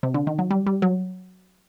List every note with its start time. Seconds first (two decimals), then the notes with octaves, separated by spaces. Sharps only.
0.03 C3
0.14 D3
0.27 D#3
0.39 F#3
0.51 G3
0.67 G3
0.82 F#3